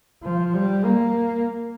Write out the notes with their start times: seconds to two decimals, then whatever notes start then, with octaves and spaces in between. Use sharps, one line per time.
0.23 F3
0.54 G3
0.85 A#3